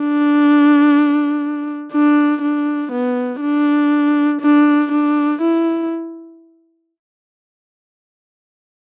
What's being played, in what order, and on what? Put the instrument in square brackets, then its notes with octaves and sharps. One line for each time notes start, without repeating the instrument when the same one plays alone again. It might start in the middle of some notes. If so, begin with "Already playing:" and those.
Already playing: [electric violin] D4
D4
D4
B3
D4
D4
D4
E4